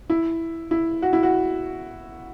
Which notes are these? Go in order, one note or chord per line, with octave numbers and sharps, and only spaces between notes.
E4
E4
F#4
E4
F#4